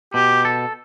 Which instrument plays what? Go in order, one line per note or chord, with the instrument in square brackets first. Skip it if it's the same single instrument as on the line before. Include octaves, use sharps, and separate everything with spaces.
[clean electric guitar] B2 [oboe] G4
[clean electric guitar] A4